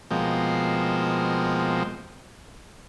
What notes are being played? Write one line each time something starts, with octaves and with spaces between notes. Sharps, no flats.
B2 F3 G#3 A#3 C4